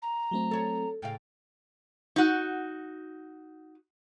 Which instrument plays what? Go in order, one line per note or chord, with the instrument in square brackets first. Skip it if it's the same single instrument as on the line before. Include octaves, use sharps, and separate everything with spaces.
[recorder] A#5
[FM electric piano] F#3 A3 C4
[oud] A4 C#5
[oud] A2 C#3 F5 [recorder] G5
[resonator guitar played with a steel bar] D#4 F#4